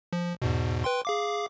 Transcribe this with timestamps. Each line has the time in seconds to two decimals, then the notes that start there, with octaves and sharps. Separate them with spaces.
0.13 F3
0.42 E2 G#2 B2
0.84 B4 G5 C6
1.05 G#4 F5 D6